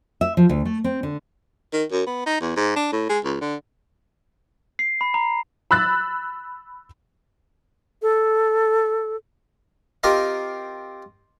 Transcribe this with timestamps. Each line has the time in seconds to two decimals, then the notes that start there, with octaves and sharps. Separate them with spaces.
0.21 E5
0.37 F3
0.49 D2
0.65 A3
0.84 C4
1.03 D3
1.73 D#3
1.92 F#2
2.07 B3
2.26 D#4
2.41 E2
2.57 G#2
2.76 D4
2.93 A2
3.09 G#3
3.25 C#2
3.41 D3
4.79 C7
5.01 B5
5.14 A#5
5.71 B5 E6 F#6 A6
8.02 A4
10.03 C4 F4 G4 A#4 D#5 F5